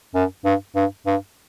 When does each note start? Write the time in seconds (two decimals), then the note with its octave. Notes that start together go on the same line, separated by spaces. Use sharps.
0.15 F#2
0.45 G2
0.76 G2
1.06 G2